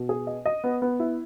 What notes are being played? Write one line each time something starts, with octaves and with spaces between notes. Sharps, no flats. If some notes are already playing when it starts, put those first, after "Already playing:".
Already playing: B2
G#4
D#5
D#5
B3
B3
E4